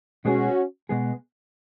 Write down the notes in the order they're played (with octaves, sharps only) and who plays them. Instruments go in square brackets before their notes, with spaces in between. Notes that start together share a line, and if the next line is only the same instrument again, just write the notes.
[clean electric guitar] B2 G#3 B3 G#4 [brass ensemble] C#4 F#4
[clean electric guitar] B2 G#3 B3 G#4